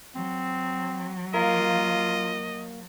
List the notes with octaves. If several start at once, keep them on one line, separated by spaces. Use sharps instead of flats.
F#3 C4
A#3 F4 A#4 D#5